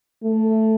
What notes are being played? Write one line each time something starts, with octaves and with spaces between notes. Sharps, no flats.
A3